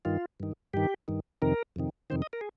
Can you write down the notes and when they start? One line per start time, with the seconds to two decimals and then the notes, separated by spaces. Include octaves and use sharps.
0.05 G2 D#3 F4
0.40 G2 D#3
0.73 G2 D#3 G4
1.08 G2 D#3
1.42 F2 C3 D#3 A#4
1.76 F2 C3 D#3
2.10 F2 C3 D#3 C5
2.22 D#5
2.33 A#4
2.41 G#4